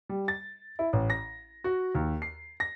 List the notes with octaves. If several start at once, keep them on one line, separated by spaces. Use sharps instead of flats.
G3
A6
E4
A1
A#6
F#4
D#2
C7
A#6